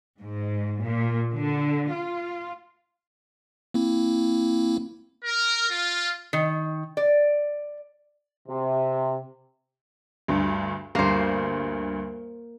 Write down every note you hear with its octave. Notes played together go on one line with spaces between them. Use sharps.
G#2
A#2
D3
F4
A#3 C4 E4
A#4
F4
D#3
D5
C3
D2 G2
D2 G2 A#3 C5